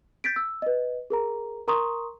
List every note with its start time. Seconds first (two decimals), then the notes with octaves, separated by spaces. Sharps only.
0.24 G6 A6 B6 D7
0.36 E6
0.62 B4 D#5
1.10 G#4 A#4 A#5
1.68 A#4 A#5 C6 C#6 D#6